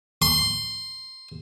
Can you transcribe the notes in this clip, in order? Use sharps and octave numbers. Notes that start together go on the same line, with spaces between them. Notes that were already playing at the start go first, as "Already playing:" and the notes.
C6